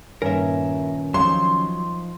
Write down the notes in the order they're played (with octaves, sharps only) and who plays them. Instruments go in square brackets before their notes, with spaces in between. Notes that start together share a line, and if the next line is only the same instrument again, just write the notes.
[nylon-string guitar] G2 A#2 [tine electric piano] D#3 C#4 [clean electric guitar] A#4 E5
[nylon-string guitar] F3 D#4 D#5 [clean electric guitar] F#3 [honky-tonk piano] C6